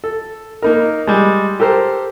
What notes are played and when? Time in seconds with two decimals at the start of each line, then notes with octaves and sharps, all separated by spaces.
0.04 A4
0.62 A#3 D#4 A#4
1.07 G3 G#3
1.60 G4 A4 A#4 C5